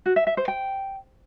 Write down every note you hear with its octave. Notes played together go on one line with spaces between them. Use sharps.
F#4
E5
E5
C5
G5